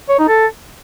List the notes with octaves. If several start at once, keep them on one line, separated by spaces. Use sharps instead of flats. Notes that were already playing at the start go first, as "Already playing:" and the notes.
C#5
D#4
A4